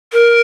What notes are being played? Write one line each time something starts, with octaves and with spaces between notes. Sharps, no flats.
A#4